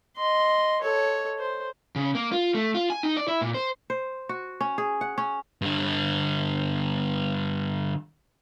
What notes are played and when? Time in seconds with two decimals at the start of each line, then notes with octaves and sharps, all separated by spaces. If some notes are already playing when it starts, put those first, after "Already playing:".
0.17 D#5 C6
0.81 A4 C#5
1.39 C5
1.96 C#3
2.15 A#3
2.32 F4
2.54 A3
2.75 F4
2.90 G#5
3.03 D#4
3.17 D5
3.28 E4
3.42 A#2
3.54 C5
3.90 C5
4.29 F#4
4.61 C#4
4.78 G#4
5.01 F#5
5.18 C#4
5.62 G2 D3